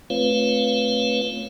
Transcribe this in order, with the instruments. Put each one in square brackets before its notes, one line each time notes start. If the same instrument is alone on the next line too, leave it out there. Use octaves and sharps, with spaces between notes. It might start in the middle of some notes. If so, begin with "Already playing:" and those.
[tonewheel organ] A3 C4 F4 B4 C#5 F5